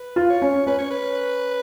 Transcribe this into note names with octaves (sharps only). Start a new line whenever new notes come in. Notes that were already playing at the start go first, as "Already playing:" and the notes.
Already playing: B4
F4
C#5
C#4
C#4 B4
C#5
B4